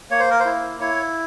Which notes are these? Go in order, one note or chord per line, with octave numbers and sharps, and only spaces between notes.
A#3 C#5
C5
A#4
C5
E4
E4 C#5